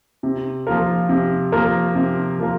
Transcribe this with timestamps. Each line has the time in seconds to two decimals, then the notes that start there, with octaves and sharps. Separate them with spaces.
0.23 C3
0.67 F3 A#3 F4 A#4
1.09 C3
1.52 F3 A#3 F4 A#4
1.95 C3
2.38 F3 A#3 F4 A#4